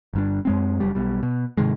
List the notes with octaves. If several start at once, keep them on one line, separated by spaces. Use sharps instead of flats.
G1 G2 D4
F#2 G#3 C4
F#1 F#2 G3
B1 B2 G3
B2
G#2 C3 D#3 G#3